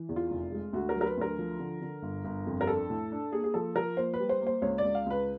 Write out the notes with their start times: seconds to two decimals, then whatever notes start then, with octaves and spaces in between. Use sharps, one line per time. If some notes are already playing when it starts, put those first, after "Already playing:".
Already playing: E3
0.09 E2
0.16 F4
0.31 F1
0.52 G#3
0.73 D2 F#4
0.89 A#4
0.96 F#3
1.01 A#4
1.06 B4
1.17 D2 A#4
1.39 F3
1.59 D3
1.81 D3
2.02 G1
2.24 G1
2.47 F2
2.61 A#4
2.67 D4 A4
2.90 A2
3.12 D4
3.32 A#3 G#4
3.44 G#4
3.54 F3 A4
3.75 F3 A#4
3.97 A#3 C5
4.13 B4
4.20 G3
4.29 C5
4.41 A#3
4.47 C5
4.62 C#2 C#5
4.78 D5
4.84 C#2
4.95 F5
5.06 C#2 B4